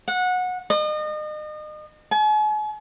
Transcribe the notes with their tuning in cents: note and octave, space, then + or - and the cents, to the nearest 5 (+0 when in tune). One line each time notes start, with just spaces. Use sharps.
F#5 -20
D#5 -35
G#5 +45